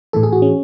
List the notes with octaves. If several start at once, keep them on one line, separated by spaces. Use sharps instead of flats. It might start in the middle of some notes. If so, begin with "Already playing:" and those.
A2 E3 A4
G#4
F#4
C#4